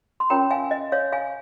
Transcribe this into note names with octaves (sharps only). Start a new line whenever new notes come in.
C6
C#4 F4 A#4 C#5 G5 A#5
F5 G#5
D#5
C#5 F5
F5 G#5